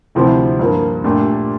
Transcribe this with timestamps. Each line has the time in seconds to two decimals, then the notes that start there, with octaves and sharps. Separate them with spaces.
0.15 D2 C3 F3 C4 E4
0.59 G2 F3 A#3
1.04 A#2 A3 D4 G4